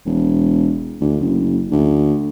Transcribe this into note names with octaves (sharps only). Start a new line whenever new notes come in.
E1
D2
F#1
D2